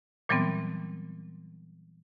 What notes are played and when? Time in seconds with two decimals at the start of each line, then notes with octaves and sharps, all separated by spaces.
0.29 A#2 E3 F#3 G3 B3 C4